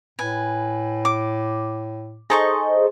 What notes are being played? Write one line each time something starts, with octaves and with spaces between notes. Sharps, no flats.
A2 B4 G#5
D6
D#4 G#4 A4 C5 D#5 C#6